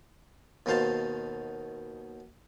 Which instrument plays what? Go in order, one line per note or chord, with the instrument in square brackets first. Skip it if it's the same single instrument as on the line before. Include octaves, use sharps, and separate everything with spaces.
[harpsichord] D#2 B2 D#3 C5 F5 A5